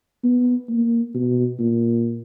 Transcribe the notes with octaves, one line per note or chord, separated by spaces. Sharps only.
B3
A#3
B2
A#2